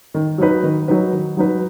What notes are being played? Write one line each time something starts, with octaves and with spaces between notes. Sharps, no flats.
D#3
F#3 D#4 B4
D#3
F#3 D#4 B4
D#3
F#3 D#4 B4